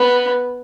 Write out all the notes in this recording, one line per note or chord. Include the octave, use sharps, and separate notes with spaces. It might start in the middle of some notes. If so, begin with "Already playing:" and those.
Already playing: B3